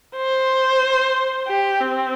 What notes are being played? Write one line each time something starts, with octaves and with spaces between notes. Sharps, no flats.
C5
G4
C4